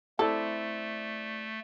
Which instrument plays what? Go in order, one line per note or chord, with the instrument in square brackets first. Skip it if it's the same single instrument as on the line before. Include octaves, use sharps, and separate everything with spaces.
[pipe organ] A3 [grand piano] C4 E4 D5 [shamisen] A4